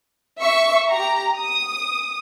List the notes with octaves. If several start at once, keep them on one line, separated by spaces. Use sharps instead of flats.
E5 C#6
G4 A#5
D#6